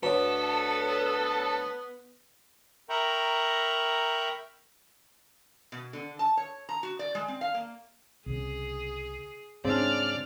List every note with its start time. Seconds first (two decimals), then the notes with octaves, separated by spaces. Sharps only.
0.03 D2 B3 A4 B4 C#5
2.89 A#4 E5 G5 A#5 B5 C#6
5.72 B2
5.93 D3
6.19 A5
6.37 C#5
6.69 A#5
6.83 F#4
6.99 D5
7.15 G#3
7.28 C4
7.41 F5
7.54 A#3
8.26 C2 C#3 G#4
9.65 G#2 C#3 C4 D4 D5 F6